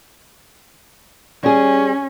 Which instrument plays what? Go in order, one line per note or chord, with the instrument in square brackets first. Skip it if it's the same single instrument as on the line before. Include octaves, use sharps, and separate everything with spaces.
[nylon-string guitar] G3 G#4 [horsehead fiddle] C#4